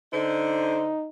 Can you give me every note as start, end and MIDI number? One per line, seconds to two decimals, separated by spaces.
0.13 0.90 50
0.13 1.09 63
0.13 0.90 72